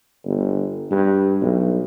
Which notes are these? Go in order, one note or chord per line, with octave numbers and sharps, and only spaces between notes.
G1
G2
B1